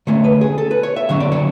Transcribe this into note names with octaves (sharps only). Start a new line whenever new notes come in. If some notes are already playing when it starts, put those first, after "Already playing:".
D3 A3 C#4 C#5
B4
G#4
A4
B4
C#5
E5
D3 F#3 C#4 E5
D5
C#5